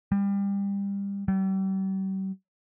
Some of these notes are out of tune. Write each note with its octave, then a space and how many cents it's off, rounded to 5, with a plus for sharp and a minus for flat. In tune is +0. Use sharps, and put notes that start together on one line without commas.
G3 +25
G3 -40